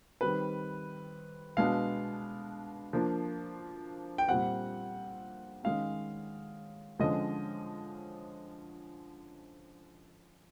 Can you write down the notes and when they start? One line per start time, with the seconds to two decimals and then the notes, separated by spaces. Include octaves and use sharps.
0.21 D#3 G3 C4 B4
1.57 B2 G#3 B3 D4 F5
2.93 F3 A#3 D4
4.18 G5
4.28 A#2 G3 C4 F#5
5.64 D#3 G#3 C#4 F5
6.99 D3 F3 G#3 C#4 D#5